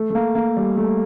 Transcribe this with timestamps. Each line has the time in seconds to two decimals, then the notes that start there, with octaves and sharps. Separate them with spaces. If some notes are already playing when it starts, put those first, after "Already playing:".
Already playing: A3
0.10 A3
0.15 A#3
0.35 A#3
0.57 G3
0.77 A3